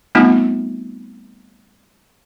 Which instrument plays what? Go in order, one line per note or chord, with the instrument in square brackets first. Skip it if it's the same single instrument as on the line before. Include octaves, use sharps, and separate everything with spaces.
[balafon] G3 A3 B3 C4 D#4 F4